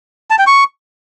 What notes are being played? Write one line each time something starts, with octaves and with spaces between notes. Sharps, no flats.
A5
G5
C#6